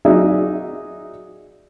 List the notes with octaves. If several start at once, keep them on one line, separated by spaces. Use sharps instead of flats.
F#3 D#4 G#4 D5 E5